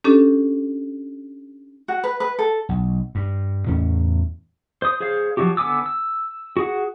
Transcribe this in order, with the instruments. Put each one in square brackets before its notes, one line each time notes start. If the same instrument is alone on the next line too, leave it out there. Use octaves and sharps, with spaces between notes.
[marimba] C#4 D4 G4 A4
[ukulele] F#4
B4
B4
A4
[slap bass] B1
G2
E2 A2 C#4
[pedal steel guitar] C5 D#6
G#4 C5 C#5 F5
F3 F#3 D#4 F#4 G4
D3 B3 G#5 D6 E6
E6
F#4 G#4 F#5